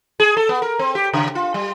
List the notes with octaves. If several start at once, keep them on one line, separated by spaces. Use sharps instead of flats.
G#4
A4
B3
A#4
C4
G4
C#3
F4
G3